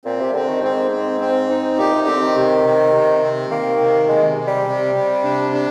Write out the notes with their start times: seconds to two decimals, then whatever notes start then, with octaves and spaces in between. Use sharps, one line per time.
0.05 A#2 C4
0.20 C3
0.34 D3 C4
0.49 D#3
0.63 G#2 C4
0.91 C4
1.20 C4
1.49 D#4
1.78 A#2 G4
1.92 C3
2.07 D3 C4
2.22 D#3
2.36 C3
2.65 C3
2.94 C3
3.22 C4
3.51 D#3 A#3
3.80 C3
4.09 C3 G#3
4.38 C3
4.47 G3
4.66 C3
4.95 C3
5.24 D4
5.53 D4